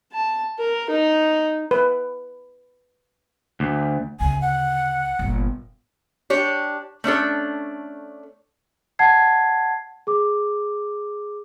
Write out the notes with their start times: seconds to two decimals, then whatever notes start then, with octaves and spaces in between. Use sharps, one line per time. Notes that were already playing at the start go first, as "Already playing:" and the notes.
0.13 A5
0.59 A#4
0.90 D#4
1.71 B4
3.60 D2
4.20 D2 C#3 G#5
4.42 F#5
5.19 G1 A#2
6.30 D4 G4 C#5
7.04 A3 C#4 D4 A4
8.99 F#5 A5 G#6 C7
10.07 G#4 D6